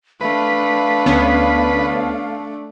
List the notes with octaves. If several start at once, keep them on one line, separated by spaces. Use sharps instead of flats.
A3 D4 B4 F5
D2 B3 C#4